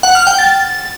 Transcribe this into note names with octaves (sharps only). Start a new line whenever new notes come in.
F#5
F6
G5
A6